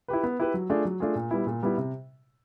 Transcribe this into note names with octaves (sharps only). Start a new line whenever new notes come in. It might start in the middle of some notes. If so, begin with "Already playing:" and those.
E4 G4 B4
B3
E4 G4 B4
F#3
A3 D4 F4 G#4
F#3
A3 D4 F4 G#4
A#2
G3 B3 E4
A#2
G3 B3 E4
C3